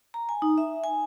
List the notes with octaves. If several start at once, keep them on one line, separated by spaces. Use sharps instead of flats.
A#5
G#5
D#4
E5
G#5